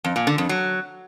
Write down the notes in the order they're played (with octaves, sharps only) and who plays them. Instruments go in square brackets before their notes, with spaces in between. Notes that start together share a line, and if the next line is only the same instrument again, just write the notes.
[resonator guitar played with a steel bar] F2
A#2
D3
F2
F#3